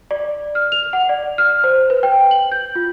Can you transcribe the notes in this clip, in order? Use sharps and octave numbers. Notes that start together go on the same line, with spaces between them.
D5
F6
F7
F#5
D5
F6
C5
B4
G5
F#7
G6
F4